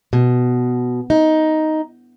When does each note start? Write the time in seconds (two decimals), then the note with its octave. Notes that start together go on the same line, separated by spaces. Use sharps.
0.13 B2
1.10 D#4